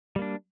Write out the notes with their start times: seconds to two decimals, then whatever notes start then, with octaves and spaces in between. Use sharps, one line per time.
0.16 G3
0.19 A#3
0.22 D4